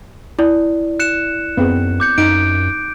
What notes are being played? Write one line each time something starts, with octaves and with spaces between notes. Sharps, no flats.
E4 D5
F#6 C#7 E7
F#2 B3 C4 G#4
D6 G6 C#7
F#2 D#4 D7